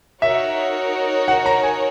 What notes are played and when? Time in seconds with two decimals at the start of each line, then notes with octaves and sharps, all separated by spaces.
0.22 D#4 F#4 A#4 C#5 E5
1.28 F#5
1.46 A#5
1.63 G#5